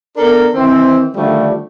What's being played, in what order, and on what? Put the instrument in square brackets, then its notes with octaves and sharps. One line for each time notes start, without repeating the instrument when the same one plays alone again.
[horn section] B3 D4 A4 A#4
D#3 E3 C4
D3 D#3 F3 G3 A3